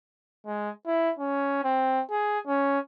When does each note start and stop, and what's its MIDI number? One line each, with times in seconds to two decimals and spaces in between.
0.46 0.71 56
0.87 1.12 64
1.19 1.61 61
1.64 2.02 60
2.11 2.39 68
2.47 2.79 61